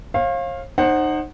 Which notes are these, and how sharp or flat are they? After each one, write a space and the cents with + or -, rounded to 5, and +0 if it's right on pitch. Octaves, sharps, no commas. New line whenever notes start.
C#5 -45 F5 +0
D#4 -25 C5 +25 F#5 +0